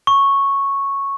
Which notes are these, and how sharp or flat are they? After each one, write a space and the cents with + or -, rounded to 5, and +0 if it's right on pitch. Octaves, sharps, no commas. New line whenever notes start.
C#6 -5